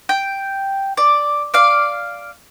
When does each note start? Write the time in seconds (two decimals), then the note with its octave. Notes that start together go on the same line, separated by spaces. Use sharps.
0.09 G5
0.97 D5
1.54 D5 F5